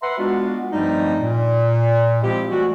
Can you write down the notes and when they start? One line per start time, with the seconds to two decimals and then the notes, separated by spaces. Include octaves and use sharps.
0.02 B4 E5 F#5 A#5 C6
0.18 G#3 B3 D4 F4 F#4
0.72 G2 F3 G3 A3 C4 D#4
1.20 A#2
2.22 F3 G#3 C4 E4 F4 G4
2.50 E3 G3 A3 F#4